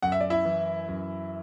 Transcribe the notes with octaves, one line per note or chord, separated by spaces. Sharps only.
F#2 F#5
E5
D5
E4 E5
E3
F#2